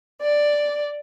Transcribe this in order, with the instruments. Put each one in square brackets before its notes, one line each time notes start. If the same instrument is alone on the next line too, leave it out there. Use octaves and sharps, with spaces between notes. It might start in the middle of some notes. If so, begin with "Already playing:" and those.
[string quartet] D5